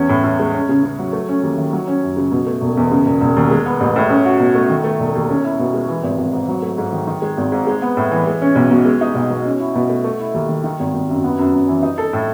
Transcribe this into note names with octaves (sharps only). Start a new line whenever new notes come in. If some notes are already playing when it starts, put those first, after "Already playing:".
Already playing: E2 C#4
A2
A2
G#3
C#4
C#3
C#3
F#3
A3
C#4
D#2
D#3
F#3
C#4
F#2
C#3
B2
A3
E1
E2
C#3
E1
E1
D#2
G#3
B3
A1
A2
C#4
F#4
B2
A3
D#3
A3
E1
D#2
C#4
E4
B2
G#3
E3
G#1
G#1
G#2
F#3
A3
G#2
D#3
D#3
G#3
G#1
G#2
G#3
B3
A2
E3
G#3
C#4
B1
B2
G#3
D#4
B1
B2
C#4
E4
B2
A3
A3
E4
D#2
D#3
D#3
G#1
G#1
F#2
B3
F#2
F#2
E3
D#4
A4
A2